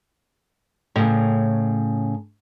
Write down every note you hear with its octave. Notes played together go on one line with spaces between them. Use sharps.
A2 C#3